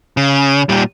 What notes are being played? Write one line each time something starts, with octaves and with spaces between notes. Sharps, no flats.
C#3
A#2 G3